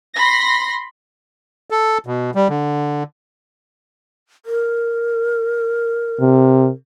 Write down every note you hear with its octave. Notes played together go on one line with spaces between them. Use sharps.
B5 C6 A#6
A4
B2
G3
D3
A#4
C3